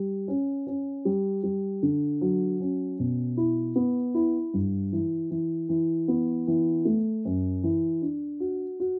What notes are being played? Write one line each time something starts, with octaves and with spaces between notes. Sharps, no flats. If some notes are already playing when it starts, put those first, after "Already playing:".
Already playing: G3
C#4
C#4
G3
G3
D3
F#3
C#4
B2
E4
B3
E4
G2
E3
E3
E3
B3
E3
A3
F#2
E3
D4
F#4
F#4